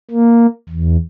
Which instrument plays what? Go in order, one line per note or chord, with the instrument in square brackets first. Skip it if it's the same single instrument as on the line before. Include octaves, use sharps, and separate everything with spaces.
[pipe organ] A#3
E2